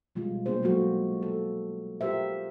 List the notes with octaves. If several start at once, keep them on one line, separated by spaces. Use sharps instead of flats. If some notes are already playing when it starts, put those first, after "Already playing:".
B2 F3 G3 G#3 F4
A#3 B3 D4 G#4 C5
F#3 G#3 A#3 F#4 A4
A4
F4 G4 A#4 C5 E5